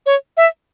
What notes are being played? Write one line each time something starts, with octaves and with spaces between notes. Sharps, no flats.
C#5
E5